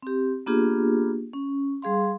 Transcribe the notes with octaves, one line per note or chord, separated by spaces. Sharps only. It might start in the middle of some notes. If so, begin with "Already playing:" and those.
C4 G4
A#3 B3 D4 F4 G4 G#4
C#4
G3 G#4 F5 C6